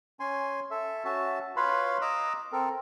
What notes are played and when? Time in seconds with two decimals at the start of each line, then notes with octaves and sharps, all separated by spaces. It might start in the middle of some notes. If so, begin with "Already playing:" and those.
0.20 C#4 G#5 C6
0.71 A4 E5
1.05 C#4 F#4 E5 A5
1.56 F4 B4 C#5 F5 B5 C6
2.01 D#5 A#5 D6 E6
2.52 C4 A4 A#4